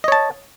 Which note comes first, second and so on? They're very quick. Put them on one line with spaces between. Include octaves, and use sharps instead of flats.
D#5 C#5 A5